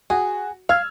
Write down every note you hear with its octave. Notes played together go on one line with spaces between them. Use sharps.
F#4 G#4
F5 E6 F6 G#6